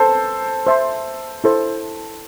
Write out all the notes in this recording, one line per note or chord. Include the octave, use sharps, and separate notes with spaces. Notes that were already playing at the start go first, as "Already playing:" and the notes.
Already playing: A4 C5
C5 E5 A5 C6
E4 A4 C5